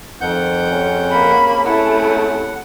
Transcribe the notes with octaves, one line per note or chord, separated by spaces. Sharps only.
F2 D#3 F3 F#5 G6
C3 C#4 G#4
A#3 B5
A3 E4 F#5